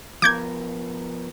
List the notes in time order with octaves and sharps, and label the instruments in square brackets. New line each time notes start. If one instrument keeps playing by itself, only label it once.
[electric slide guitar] F3 B3 A#4 [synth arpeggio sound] D6 G6 G#6